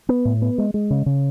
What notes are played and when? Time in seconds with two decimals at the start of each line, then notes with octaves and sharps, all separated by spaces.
0.09 B3
0.25 A2
0.42 B3
0.58 G#3
0.74 G#3
0.90 C#3
1.06 C#3